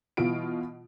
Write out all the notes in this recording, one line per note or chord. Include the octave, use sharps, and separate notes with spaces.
B2 E3 F4 D7